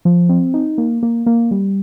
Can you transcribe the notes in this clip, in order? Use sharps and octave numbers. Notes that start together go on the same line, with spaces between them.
F3
C4
D#4
A#3
A#3
A#3
G3